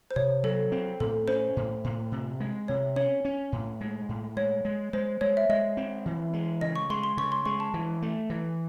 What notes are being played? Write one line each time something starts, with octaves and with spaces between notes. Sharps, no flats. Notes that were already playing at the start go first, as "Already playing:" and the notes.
C5
C3 C#5
F#3 A4
C4
A2 A4
C#4 C5
A2
A2
C3
G#3
C3 C#5
C#4 C#5
C#4
A2
G#3
A2
G#3 C#5
G#3
G#3 C5
G#3 C#5
E5
G#3 D#5
C4
E3
G#3
C#3 D#5
C#6
G#3 C6
C6
C#3 C#6
C6
G#3 C#6
A5
E3
A3
E3